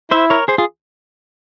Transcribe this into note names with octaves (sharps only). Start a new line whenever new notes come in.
E4 C5 E5
A#4 C#5
G#4 C5
F4 G#4